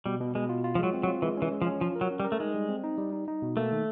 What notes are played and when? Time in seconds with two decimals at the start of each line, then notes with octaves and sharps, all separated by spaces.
0.06 B2 G3
0.20 B2
0.35 B2 G#3
0.49 F4
0.64 F4
0.75 F3
0.78 F#3 G#3
0.93 C4
1.03 F#3
1.08 F4
1.22 E3 G#3
1.37 E3 C#4
1.51 G#3
1.62 F3
1.67 C#4
1.81 F3 F4
1.96 A#4
2.01 F#3
2.11 C#4
2.20 G3
2.24 A#4
2.32 A3
2.40 G#3 D#4
2.55 G3
2.69 C4
2.84 D#4
2.98 G3
3.13 D#4
3.28 D#4
3.42 B2
3.57 A3 A#3
3.72 D#3